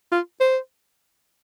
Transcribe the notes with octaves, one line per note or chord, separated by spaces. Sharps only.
F4
C5